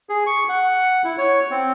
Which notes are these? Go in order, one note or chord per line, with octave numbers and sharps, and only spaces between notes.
G#4
C#6
F#5
E4
C#5
C4